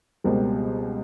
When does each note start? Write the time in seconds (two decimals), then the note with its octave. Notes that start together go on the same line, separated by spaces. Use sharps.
0.24 C#2 B2 G3 C4 A#4